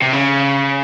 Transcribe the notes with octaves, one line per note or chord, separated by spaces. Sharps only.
C3
C#3